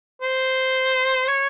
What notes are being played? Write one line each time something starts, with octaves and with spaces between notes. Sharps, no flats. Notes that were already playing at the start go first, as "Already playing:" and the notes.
C5
C#5